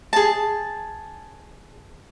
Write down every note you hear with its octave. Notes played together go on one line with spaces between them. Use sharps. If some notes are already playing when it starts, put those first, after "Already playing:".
G#4 A5